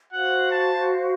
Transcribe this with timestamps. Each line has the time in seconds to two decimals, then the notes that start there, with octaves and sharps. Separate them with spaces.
0.13 F#4 C5 F5 F#5
0.51 A5